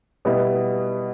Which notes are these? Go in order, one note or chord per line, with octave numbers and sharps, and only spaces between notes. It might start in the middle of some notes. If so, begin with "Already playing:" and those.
B2 G3 B3 E4